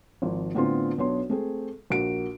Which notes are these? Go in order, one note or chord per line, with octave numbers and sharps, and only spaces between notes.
G#1 F3
A2 D3 B3 C4 D4 F4
B1 B3 D4 C#5 C6
A3 C4 G#4
A#1 F#4 A#4 D7